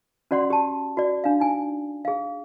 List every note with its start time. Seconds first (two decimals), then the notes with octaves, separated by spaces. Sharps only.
0.31 C#4 F#4 D5 F#5 C6
0.50 G4 A5
0.97 F#4 D5
1.24 D4 F5
1.40 D#4 G#5
2.05 G#4 F5